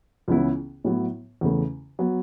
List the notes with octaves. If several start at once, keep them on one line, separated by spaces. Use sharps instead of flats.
C#2 C#3 E3 B3 E4
A2 F#3 B3 E4
E2 C#3 A3
F#3 B3